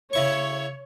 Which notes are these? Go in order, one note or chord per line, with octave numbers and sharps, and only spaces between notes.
C#3 E4 C#5 C#6